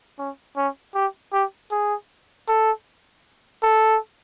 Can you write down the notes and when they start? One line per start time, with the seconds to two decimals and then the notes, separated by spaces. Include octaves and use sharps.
0.18 C#4
0.57 C#4
0.94 G4
1.33 G4
1.71 G#4
2.48 A4
3.63 A4